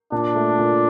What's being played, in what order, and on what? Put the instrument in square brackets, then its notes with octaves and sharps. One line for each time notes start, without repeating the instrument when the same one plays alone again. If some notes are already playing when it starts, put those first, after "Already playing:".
[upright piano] A#2 [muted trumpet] D4
[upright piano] A3
A#2